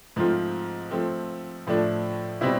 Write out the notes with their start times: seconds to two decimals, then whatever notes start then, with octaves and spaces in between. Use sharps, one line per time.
0.16 G#2 F3 A3 C4 F4
0.91 F3 A3 C4
1.67 A2 F3 A3 D4
2.41 B2 G3 C4 E4